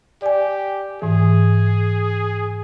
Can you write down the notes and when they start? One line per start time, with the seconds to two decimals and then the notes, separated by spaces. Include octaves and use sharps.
0.22 G4 D5 G#5
1.02 G#2 E3 G#4